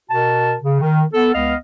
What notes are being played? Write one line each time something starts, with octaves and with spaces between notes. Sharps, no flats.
B2 F#4 A#4 A5
C#3
D#3
B3 A4
C#2 B3 D#5 F5 F6